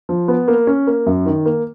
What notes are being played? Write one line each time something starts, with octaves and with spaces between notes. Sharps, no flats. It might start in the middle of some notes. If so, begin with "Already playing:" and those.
F3
B3
A#3
C#4
A#3
F#2
D#3
A#3